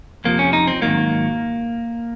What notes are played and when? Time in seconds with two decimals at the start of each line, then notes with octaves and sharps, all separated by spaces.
0.25 F2 C3 F3 A#3
0.39 C#4
0.53 D#4
0.67 C4
0.81 G#2 D#3 F#3 A#3